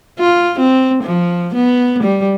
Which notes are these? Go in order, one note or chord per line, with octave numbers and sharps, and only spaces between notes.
F4
C4
F3
B3
G3